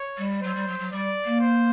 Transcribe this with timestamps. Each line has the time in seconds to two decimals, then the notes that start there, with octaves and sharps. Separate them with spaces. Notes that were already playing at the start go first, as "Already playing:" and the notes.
Already playing: C#5
0.17 G3
0.42 F#3 C5
0.55 G3
0.67 F#3
0.79 F#3
0.92 G3 D5
1.25 A#3
1.40 C5